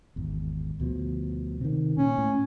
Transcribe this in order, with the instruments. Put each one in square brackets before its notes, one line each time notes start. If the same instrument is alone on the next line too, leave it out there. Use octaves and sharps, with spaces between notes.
[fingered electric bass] G#1 E2
D2 B2 F3
C3 D#3
[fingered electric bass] A#2 [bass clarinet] C#4
[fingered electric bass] A2